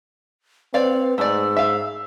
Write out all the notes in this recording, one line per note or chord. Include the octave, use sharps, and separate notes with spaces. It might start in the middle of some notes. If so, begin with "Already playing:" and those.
C4 B4 C#5 D5 F5
G#2 A3 D5 E6
E5 F5